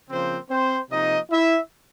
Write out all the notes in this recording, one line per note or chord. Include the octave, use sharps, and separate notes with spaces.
C#3 F3 A#3 C4 C5
C4 C5
C3 F3 A#3 D#4 D#5
E4 E5